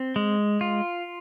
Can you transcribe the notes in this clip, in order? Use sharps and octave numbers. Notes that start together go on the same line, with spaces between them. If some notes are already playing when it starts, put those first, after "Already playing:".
Already playing: C4
G#3
F4